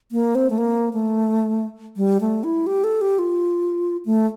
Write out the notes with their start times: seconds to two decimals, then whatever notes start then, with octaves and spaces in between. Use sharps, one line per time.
0.12 A#3
0.35 C4
0.50 A3
0.58 A#3
0.93 A3
1.97 G3
2.21 A3
2.44 E4
2.67 G4
2.84 A4
3.01 G4
3.19 F4
4.06 A3